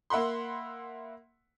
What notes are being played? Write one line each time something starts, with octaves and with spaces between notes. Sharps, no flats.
A#3 E5 F#5 B5 C6